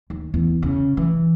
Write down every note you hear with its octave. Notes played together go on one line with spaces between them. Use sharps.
D#2
E2
C#3
E3